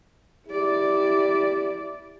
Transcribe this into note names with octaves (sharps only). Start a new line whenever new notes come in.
E4 G4 D5